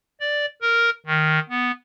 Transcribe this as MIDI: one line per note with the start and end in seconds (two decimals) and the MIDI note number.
0.20 0.46 74
0.62 0.90 70
1.06 1.39 51
1.50 1.71 59